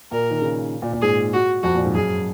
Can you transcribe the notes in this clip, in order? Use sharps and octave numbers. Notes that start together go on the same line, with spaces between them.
A#2 A#4
D#3
C#3
A#2
A#2
G#2 G#4
F#4
F2 F#4
A#2
G#2
F#2 G#4